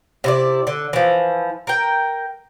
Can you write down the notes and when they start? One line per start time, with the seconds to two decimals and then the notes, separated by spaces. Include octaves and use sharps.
0.24 C3 E4 D5
0.67 D3
0.93 E3 F3
1.67 A#4 G5